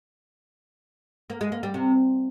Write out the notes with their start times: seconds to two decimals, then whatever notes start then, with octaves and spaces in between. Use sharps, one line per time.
1.30 A#3
1.41 G#3
1.52 A#3
1.63 G3
1.74 C3